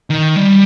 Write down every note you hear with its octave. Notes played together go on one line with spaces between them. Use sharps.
D#3
G3